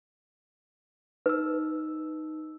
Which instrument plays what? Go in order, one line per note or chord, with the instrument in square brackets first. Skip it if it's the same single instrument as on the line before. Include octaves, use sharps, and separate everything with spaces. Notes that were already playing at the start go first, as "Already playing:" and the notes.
[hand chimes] D#4 E6 [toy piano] B4